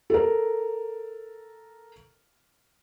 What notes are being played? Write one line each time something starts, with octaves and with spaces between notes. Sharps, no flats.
A4 A#4